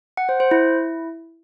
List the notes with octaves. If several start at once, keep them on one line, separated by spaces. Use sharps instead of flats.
F#5
C5
C5
E4